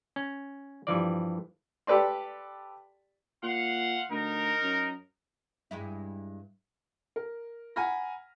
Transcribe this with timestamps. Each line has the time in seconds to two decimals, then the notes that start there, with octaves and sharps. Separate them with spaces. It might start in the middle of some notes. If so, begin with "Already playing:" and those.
0.16 C#4
0.87 G2 E3 F3 D5
1.87 G4 A4 B4 D5 C6
3.43 A#2 F5 F#5 C6
4.10 D2 D#4 A#4
4.63 F#2
5.71 G2 G#3 E4
7.16 A#4
7.76 F#5 G#5 A#5 B5 F6 A#6